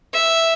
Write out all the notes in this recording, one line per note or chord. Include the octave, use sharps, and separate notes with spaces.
E5